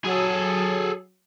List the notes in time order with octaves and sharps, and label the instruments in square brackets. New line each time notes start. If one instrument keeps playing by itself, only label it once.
[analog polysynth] F#3 [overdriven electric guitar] G#4 A4